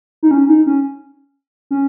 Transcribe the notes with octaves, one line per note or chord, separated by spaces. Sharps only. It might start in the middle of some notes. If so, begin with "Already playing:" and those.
D#4
C#4
D#4
C#4
C#4